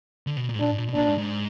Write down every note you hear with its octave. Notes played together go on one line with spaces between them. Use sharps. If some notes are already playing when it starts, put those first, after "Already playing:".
D3
B2
A#2
G#2
A#2 D4
G#2
A#2
B2
A#2 D4
G#2
G#2